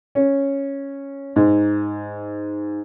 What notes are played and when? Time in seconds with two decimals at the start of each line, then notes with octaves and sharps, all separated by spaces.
0.15 C#4
1.36 G#2